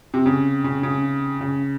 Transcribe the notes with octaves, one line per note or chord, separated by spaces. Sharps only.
C3
C#3
C#3
C#3
C#3